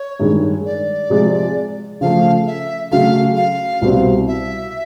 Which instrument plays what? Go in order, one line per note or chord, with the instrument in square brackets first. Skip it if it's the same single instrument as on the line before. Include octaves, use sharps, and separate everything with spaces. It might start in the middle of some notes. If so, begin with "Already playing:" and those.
Already playing: [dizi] C#5
[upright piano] G2 D#3 G#3
[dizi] D5
[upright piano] C3 F3 G#3
[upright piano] C#3 F3 A3 [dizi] F5
[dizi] E5
[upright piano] C#3 F#3 A3 [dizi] F5
[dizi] F5
[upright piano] C2 B2 G3 C4
[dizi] E5